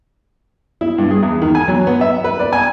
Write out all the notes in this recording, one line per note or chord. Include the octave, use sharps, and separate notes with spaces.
E4
G2
G#4
E2
D#3
G#5
F#3
B3
E5
B4
D5
G#5